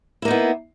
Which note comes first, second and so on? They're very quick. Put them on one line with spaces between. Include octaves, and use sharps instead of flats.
E4 A#3 D#4 B3